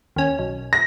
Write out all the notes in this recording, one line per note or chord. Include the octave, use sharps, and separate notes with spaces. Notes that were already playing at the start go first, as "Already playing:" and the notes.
D#2 C#4
B1
A#6